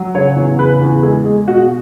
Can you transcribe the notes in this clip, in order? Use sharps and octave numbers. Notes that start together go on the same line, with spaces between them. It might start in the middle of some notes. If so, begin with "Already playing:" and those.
Already playing: F#3
C#3 C#5
E2
C#3 B4
E2
G#3 G#4
G#3
B2 F#4